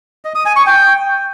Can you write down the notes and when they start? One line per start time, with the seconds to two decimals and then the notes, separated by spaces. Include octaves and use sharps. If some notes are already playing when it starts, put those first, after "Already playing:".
0.25 D#5
0.35 D#6
0.46 G#5
0.56 C#6
0.66 G5